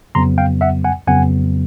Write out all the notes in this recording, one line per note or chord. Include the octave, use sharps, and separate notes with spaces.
F2 C#3 F#3 B3 A#5 C6
F5 G5
E5 F#5
F#5 G#5
F2 C#3 F#3 B3 F#5 G#5